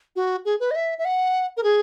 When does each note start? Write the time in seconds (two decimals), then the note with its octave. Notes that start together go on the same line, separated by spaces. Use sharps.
0.16 F#4
0.45 G#4
0.60 B4
0.71 D#5
0.76 E5
0.99 E5
1.05 F#5
1.57 A#4
1.63 G#4